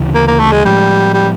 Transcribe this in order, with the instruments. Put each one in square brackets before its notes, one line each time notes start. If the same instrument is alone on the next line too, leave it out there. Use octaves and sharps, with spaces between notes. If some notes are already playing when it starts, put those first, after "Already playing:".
Already playing: [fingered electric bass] D2 C#3 E3
[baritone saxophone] A#3
A#3
A3
G#3
[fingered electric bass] A2 F3 G#3 [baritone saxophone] G3
[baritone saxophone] G3